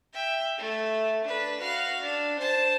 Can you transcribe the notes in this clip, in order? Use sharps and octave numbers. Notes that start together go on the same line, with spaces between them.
E5 G5
A3
D4 B4
F#4 F5
D4
C5 A5